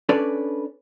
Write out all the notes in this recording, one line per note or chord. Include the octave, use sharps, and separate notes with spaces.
C#4 D4 A4 B4 C#5 D5